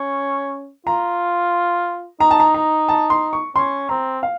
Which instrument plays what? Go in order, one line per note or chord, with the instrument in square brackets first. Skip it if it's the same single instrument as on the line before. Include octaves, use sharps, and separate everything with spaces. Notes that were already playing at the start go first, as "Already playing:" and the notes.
Already playing: [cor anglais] C#4
[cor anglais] F4 [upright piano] A#5
[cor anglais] D#4 [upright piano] A#5
[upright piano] A5
A#5
A#5
A5
C6
C#6
[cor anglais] C#4 [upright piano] C6
[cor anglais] C4 [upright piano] A#5
[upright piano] F5